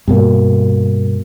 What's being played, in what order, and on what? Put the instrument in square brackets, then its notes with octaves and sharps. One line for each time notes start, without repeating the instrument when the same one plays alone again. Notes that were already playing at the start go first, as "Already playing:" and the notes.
[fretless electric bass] G2 B2 A#3